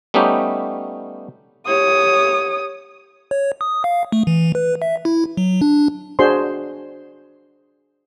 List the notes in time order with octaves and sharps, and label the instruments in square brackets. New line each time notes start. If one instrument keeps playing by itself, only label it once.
[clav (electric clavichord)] G3 A3 B3 C#4 D#4 G4
[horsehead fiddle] G4 C#5 [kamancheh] D#6
[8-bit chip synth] C#5
D#6
F5
A3
E3
B4
E5
E4
F#3
D4
[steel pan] D4 F#4 G#4 C5 C6